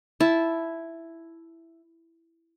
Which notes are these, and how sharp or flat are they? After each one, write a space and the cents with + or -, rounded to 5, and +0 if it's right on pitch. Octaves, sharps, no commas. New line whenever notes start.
E4 +5 A5 -10